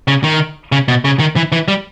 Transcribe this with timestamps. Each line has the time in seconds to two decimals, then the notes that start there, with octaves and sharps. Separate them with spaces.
0.08 C#3
0.24 D#3
0.72 C#3
0.88 B2
1.05 C#3
1.20 D#3
1.36 E3
1.52 E3
1.68 G3